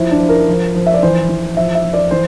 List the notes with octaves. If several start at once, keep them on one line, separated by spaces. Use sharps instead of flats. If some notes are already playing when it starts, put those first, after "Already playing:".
Already playing: F3 E4
D4
F3
A#4
F3
F3
E5
D5
E3 C5
E3
F3 E5
E5
F3
D5
E3 C5